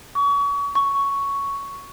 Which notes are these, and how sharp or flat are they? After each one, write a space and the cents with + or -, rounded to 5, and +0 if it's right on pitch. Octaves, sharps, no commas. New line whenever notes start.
C#6 +35
C#6 +5